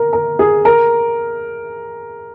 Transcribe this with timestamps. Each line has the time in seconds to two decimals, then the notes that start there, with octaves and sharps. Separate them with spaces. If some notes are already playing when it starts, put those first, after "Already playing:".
Already playing: A#4
0.13 A#4
0.39 G#4
0.65 A#4